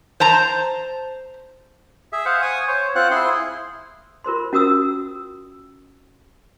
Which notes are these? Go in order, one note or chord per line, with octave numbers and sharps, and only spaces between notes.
C5 A5 A#5
G#4 E5
C5 F5 F#5
G#5 C#6 D#6
C5 C#5
C4 F4 C5 F#5 F#6
E4 G#4 C6
F4 A#4 C5 C6
C#4 F#4 A#4 D#6 E6